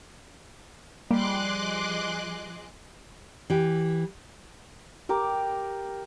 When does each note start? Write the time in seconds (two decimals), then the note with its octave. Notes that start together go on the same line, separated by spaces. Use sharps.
1.11 F3 G3 A#3 G#4 D#5 C6 D6 F#6
3.50 E3 G4
5.09 G4 A#4 D6